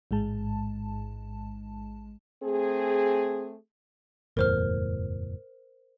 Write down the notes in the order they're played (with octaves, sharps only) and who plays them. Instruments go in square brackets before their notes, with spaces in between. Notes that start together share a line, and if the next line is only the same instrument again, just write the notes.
[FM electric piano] A1 G#2 G#3 A5
[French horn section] A3 C4 G#4
[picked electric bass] F#1 E2 A2 [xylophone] A#4 C5 F6